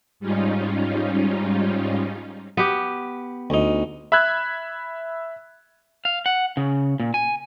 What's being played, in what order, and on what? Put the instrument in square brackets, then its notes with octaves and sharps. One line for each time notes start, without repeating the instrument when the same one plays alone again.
[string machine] G#2 G3 C#4 D#4 F4
[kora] B3 G4
[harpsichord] D2 D#4
[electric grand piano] E5 B5 E6 F#6 G#6
[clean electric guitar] F5
F#5
C#3
A#2
G#5